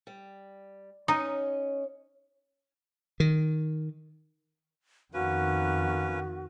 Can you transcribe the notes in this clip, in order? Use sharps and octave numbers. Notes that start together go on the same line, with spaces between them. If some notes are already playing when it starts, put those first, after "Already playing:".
G3
C#4 D#4 C#5 D#5
D#3
F2 D#3 A#3 C#4 F#4 B4